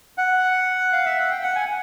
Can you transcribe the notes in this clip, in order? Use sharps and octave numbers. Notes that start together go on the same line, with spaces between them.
F#5
F5
E5
F#5
G5
F#5
G#5